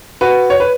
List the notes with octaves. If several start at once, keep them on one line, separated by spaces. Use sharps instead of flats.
F#4 B4
C#5
B4